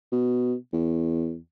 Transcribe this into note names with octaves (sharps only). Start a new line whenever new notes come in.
B2
E2